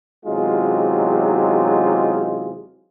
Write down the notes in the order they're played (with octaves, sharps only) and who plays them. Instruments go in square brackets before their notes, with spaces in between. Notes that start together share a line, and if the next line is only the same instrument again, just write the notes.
[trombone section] E2 C3 F#3 G#3 D#4 F4